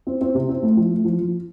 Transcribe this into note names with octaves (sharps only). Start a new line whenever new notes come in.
C4
C4
C3
C4
A3
F3
A3
F3
F3